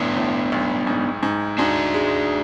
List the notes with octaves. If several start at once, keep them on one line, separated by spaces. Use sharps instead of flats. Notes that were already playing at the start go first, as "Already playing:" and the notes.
Already playing: B1 A2 B3 D4
A2
B1
G#2
G#2
G#2 D4 F#4
G#3